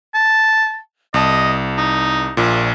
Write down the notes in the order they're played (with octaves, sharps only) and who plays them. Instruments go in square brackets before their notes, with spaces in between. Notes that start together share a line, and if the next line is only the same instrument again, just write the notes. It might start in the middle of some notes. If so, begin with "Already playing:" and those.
[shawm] A5
[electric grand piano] C2 A5 [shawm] D#5
[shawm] D#4
[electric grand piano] A#1 A#2